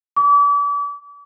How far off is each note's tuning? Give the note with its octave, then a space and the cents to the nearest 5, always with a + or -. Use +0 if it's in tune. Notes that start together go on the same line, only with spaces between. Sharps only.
D6 -40